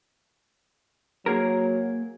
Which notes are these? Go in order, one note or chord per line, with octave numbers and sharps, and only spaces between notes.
F#3 A#3 G#4 A#4